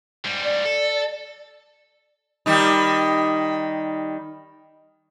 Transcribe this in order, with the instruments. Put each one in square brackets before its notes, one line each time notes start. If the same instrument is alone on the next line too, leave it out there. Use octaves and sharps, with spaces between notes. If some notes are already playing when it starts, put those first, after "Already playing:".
[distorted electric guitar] G#2 G3
[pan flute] D5
[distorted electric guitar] A4
[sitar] D#3 G3 D#4